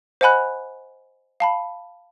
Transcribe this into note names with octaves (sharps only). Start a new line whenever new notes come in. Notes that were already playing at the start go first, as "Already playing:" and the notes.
C5 D#5 F#5 G#5 B5 F#6
F5 A5 B5